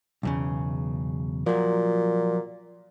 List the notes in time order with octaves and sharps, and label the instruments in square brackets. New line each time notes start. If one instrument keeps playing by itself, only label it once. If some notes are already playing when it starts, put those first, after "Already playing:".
[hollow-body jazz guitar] B1 E2 C#3
[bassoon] A#2 [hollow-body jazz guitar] F3 F#3